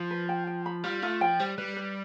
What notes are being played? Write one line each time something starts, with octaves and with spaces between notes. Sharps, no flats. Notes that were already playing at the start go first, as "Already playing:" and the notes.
Already playing: F3
B4
G5
G5
B5
G3 F4
A3 F4
F3 G5
G3 C5
G3 B4
B4